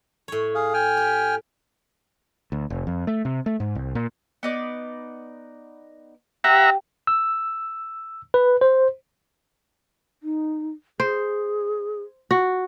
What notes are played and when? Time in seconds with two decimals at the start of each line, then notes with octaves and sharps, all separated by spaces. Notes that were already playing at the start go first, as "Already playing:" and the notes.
0.28 A2 C#5
0.54 G#4 F5
0.74 G5 G#5 F6
0.97 G4
2.52 D2
2.70 F1
2.87 F2
3.07 A3
3.25 C3
3.46 A3
3.60 G#2
3.75 C2
3.95 A#2
4.43 B3 D#4 D5
6.44 G4 E5 F#5 A#5
7.07 E6
8.34 B4
8.61 C5
10.23 D#4
11.00 G#4 C5
12.31 F#4